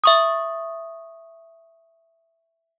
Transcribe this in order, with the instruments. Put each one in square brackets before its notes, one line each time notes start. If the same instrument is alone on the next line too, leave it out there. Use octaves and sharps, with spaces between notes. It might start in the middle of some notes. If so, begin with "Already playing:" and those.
[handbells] E5 C#6 D#6